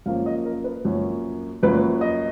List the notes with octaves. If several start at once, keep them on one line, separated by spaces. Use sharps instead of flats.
F#2 F3 A#3 C#4 F5
D#5
A#4
B4
F#2 F3 A#3 C#4
F#2 F3 A#3 C#4 B4
D#5